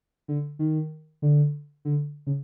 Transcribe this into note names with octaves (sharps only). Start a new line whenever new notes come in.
D3
D#3
D3
D3
C#3